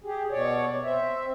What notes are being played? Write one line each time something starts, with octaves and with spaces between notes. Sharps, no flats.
G4 G#4
B2 C#5 D5
C4 E5